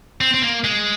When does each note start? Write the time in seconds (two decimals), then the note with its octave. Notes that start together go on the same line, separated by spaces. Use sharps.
0.21 C4
0.34 C4
0.42 A#3
0.64 G#3